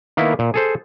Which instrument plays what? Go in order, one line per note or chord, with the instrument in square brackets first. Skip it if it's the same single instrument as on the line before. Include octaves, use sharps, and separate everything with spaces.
[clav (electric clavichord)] D#3 A#3 B3 E4
A#2
G#4 A4 C5